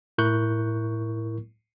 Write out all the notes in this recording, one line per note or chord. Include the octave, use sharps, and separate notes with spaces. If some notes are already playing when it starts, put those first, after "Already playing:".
A2 E4 A#4 C#6 F#6 G6